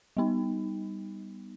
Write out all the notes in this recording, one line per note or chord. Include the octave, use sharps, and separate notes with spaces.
G3 B3 D#4